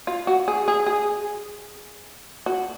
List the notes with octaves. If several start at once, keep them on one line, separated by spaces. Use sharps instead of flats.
F4
F#4
G#4
G#4
G#4
F#4